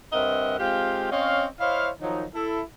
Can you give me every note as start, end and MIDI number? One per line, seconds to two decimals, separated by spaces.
0.13 0.56 43
0.13 0.56 60
0.13 0.56 70
0.13 0.56 75
0.13 0.56 76
0.13 0.56 78
0.59 1.09 56
0.59 1.09 60
0.59 1.09 65
0.59 1.09 67
0.59 1.09 77
0.59 1.09 79
1.11 1.46 60
1.11 1.46 61
1.11 1.46 73
1.11 1.46 75
1.11 1.46 77
1.60 1.89 64
1.60 1.89 72
1.60 1.89 73
1.60 1.89 75
1.60 1.89 77
2.01 2.25 51
2.01 2.25 53
2.01 2.25 54
2.01 2.25 63
2.34 2.60 64
2.34 2.60 69